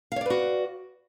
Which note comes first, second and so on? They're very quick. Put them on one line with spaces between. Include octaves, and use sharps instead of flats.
F5 C#5 D5 B4 F#4